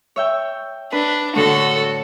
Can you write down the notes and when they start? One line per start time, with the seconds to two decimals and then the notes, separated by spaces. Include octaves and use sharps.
0.16 C#5 E5 G5
0.92 D4 B4
1.35 A2 D3 A3 F#4 A4